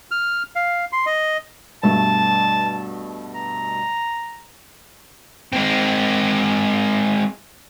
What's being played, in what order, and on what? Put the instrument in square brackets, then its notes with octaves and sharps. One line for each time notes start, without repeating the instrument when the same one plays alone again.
[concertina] F6
F5
C6
D#5
[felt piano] G2 B2 A3 [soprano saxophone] A5
[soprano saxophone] A#5
[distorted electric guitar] G#3 C4